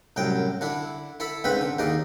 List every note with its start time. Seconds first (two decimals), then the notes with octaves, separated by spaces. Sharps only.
0.16 C2 F#2 A2 G5
0.61 D3 D4 E4
1.20 E4 A4 B5
1.44 C#2 G#2 C4 B4 B5
1.61 D3
1.79 D#2 D#4 G#4 D5